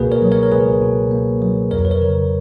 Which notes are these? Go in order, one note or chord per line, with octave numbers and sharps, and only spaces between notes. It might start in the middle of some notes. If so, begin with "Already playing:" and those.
Already playing: C#2 B2 A#3 F#4 G#4 A#4 B4
A#4 C#5
F#3
A#4 C#5
A#4
C#2 G#4 B4
B2
A#3
F#3
F2 A#4 C#5
B4
A#4 C#5
C#3